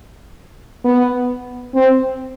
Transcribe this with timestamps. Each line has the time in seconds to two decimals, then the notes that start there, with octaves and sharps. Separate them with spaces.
0.84 B3
1.75 C4